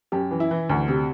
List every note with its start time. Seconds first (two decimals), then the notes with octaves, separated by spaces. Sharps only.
0.12 F#2 G4
0.31 E3
0.40 E4
0.51 E3
0.69 D2
0.88 C3